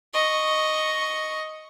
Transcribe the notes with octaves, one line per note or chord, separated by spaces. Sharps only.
D#5 C#6